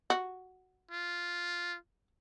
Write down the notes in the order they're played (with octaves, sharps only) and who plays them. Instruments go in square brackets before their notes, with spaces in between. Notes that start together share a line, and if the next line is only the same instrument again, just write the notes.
[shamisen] F#4
[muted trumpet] F4